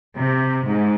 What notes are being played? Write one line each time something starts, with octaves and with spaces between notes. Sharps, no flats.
C3
G#2